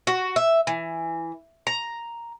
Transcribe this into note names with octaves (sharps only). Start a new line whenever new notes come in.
F#4
E5
E3
A#5